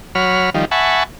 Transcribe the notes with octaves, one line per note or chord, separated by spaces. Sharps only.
F#3 C#5 B5 F6
D#3 F3 G3
E5 F#5 G#5 A5 B5 C#6